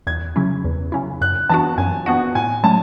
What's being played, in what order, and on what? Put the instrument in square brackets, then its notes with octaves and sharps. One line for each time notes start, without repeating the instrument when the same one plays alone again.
[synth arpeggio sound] E2 [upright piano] G#6
[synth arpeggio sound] C#3 F#3 C#4 E4
E2
C#3 F#3 C#4 E4
[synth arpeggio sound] F#2 [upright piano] F#6
[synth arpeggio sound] E3 B3 D4 F#4 [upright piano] A5
[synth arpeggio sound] F#2 [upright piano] G#5
[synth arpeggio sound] E3 B3 D4 F#4 [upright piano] F#5
[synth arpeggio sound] A2 [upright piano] G#5
[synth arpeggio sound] F#3 A3 C#4 [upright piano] A5